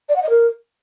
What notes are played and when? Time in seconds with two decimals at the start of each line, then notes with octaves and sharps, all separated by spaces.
0.09 D5
0.16 F#5
0.23 D#5
0.29 A#4